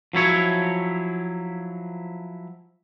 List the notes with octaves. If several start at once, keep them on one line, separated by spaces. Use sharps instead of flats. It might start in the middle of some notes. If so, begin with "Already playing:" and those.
F3 F#3 E4 C#5